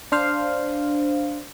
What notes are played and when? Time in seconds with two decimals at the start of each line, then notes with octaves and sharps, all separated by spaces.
0.12 D4 C5 F5